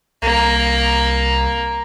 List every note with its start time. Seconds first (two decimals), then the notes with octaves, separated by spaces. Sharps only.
0.22 C2 A#3